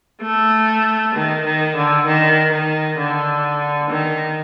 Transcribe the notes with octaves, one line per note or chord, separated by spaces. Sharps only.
A3
D#3
D#3
D3
D#3
D#3
D3
D#3